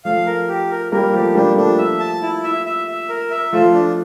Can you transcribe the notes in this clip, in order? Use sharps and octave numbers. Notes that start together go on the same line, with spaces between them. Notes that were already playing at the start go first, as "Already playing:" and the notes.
F3 A3 F5
A#4
G4
A#4
G3 A#3 A#4
F3 A3 G4
G3 A#3 D4
F3 A3 D4
E5
A5
E4
E5
E5
E5
A#4
E5
F3 A3 F4
D4